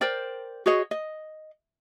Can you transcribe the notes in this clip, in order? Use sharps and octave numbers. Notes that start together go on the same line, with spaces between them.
A#4 C5 D5 G5
F#4 G#4 C#5 D#5
D#5